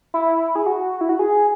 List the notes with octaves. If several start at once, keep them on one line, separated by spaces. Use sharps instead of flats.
E4
G#4
F#4
E4
F#4
G#4